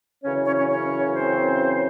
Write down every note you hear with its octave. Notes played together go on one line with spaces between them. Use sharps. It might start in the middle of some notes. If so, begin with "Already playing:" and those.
F#2 C#3 E3 C#4 C#5
C#4 C#5
C#4 C#5
C#4 C#5
C4 C5